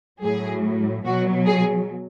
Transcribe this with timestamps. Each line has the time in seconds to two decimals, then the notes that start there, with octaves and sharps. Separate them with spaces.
0.23 A2 F#3 G#4
1.04 B2 F#3 F#4
1.46 G#4